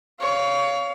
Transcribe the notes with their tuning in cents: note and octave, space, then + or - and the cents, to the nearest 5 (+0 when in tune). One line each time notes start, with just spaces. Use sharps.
C#5 +30 F5 +0